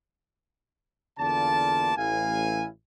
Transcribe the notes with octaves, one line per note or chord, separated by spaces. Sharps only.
E2 D3 A#3 F4 D5 A5
A1 E4 F5 G#5